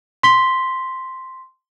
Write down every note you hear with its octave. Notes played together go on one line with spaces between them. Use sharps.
C6 B6 G7